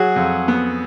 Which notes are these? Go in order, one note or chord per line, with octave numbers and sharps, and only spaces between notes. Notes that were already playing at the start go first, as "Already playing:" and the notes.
Already playing: F#3 F#4 G#4
F2
B3